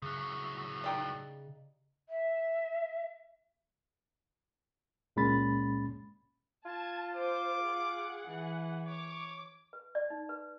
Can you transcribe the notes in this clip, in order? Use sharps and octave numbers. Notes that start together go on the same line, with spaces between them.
A2 C#3 F#3
D#4 G4 D5
E5
C#2 A#2 G#3 C#4 B5 A6
F4 A5 G#6
C5 D6
G#4 F#5
E3
C#5 D6
B4
D5
D#4
B4